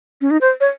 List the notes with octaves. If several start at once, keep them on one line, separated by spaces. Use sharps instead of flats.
C#4
D#4
C5
C#5